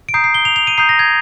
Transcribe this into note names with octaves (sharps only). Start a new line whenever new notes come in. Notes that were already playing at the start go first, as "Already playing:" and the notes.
D7
A#5 D#6 G6 C7
C7
G7
F7
F7
D#7
A#5 D#6 G6 C7
A#6
G#6